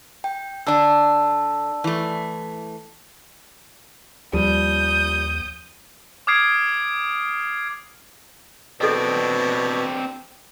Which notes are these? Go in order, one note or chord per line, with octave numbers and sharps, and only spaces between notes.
G5
D3 D4 D5 A5 E6
E3 A3
D#2 F3 G3 D#6 G6
D6 D#6 F6 G#6 C7 D7
B2 C4 D4 A4 D#5